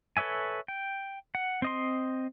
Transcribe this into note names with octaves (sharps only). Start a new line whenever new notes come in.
A4 B4 C#5 E5 G#5
G5
F#5
C4 D#5 C6